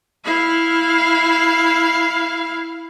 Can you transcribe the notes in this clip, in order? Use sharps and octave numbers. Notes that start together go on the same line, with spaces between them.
E4 F5